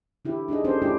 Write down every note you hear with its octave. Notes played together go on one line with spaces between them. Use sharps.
D3 E4 G4
D4 D#4 G#4 D#5
C#4 D4 G4 A4 C5
A3 D4 E4 F4 G4